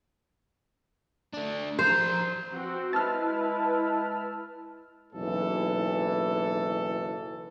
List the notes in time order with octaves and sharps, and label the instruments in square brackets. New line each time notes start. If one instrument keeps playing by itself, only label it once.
[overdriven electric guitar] A3 D4
[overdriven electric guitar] F3 A#5 [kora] C5
[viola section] C4 F#4
[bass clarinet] G#3 [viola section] E4 B4 [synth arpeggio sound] A5 E6 F6
[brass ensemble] F#1 B1 E3 A4